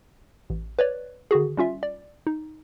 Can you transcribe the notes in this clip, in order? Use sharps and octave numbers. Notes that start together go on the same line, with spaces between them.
A1
B4 C#5 D5
D3 D#3 F#4 G#4
G3 C#4 F4 E5
D5
D#4